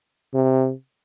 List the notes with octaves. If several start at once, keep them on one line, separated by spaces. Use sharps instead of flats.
C3